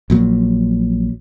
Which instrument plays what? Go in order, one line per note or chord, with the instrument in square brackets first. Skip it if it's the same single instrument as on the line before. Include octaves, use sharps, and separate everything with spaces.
[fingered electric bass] A#1 A#2 F#3